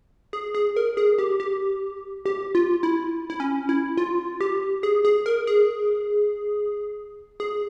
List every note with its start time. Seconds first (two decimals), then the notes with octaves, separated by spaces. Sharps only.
0.33 G#4
0.55 G#4
0.76 A#4
0.97 G#4
1.19 G4
1.40 G4
2.26 G4
2.55 F4
2.83 E4
3.30 E4
3.40 C#4
3.69 E4
3.97 F4
4.41 G4
4.83 G#4
5.05 G#4
5.26 A#4
5.47 G#4
7.40 G#4